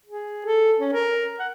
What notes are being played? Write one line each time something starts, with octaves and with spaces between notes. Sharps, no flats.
G#4
A4
C#4
A#4
F#5